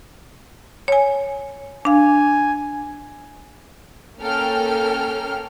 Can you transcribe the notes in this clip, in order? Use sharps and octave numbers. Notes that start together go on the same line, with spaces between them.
C#5 G#5
D4 F5 G#5
A#3 C#4 A4 G5 F6